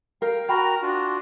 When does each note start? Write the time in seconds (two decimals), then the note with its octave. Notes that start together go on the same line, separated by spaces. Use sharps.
0.22 A#4 F5 G5
0.49 F#4 A#4 G5 A#5 B5
0.82 D4 F4 F#4